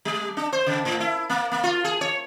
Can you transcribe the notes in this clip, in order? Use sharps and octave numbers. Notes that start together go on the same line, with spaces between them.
G3
D4
C5
C#3
A2
E4
A#3
A#3
F4
G#4
C#5